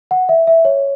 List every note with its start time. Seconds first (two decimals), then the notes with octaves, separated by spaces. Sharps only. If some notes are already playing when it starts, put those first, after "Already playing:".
0.11 F#5
0.29 E5
0.47 E5
0.65 C#5